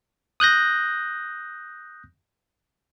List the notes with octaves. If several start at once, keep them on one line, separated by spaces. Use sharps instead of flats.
D#6 F#6 G6 A#6